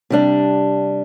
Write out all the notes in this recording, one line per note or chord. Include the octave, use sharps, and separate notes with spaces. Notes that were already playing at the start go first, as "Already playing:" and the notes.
C3 G3 D4